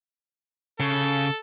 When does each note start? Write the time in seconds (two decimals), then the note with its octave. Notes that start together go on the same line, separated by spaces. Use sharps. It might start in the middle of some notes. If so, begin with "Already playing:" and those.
0.80 C#3 A4